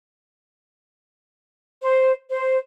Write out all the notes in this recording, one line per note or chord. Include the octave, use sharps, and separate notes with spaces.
C5
C5